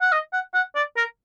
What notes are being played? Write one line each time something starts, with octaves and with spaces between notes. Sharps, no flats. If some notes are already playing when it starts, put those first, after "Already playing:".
F#5
D#5
F#5
F#5
D5
A#4